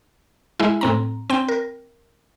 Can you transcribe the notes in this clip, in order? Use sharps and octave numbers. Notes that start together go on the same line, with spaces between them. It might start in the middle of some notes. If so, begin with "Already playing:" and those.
G#3 E4
A2 C4 A#5
C4 G5
A#4